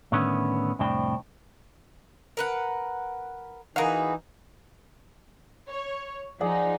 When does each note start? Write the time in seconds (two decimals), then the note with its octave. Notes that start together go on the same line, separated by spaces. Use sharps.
0.12 A2 D3 D#3 B3 C#4
0.79 C2 F2 A2 C4 D4 G5
2.37 A#4 B4 F#5
3.76 E3 D#4 F#4 G#4 A#4 B4 F5
5.67 C#5
6.41 F3 D#4 G#4 D5 F#5